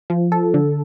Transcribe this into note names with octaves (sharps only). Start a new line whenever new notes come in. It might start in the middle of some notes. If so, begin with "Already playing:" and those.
F3
A4
D3